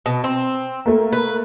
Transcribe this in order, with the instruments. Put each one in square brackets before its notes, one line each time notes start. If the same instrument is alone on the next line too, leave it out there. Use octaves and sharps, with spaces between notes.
[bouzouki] B2
C4
[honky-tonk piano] A3 A#3
[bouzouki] B4